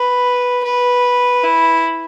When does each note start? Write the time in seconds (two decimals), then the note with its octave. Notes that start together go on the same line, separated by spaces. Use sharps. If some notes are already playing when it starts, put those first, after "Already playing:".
Already playing: B4
0.64 B4
1.44 E4